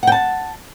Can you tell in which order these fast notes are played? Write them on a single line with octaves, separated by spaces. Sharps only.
F#5 G5 A5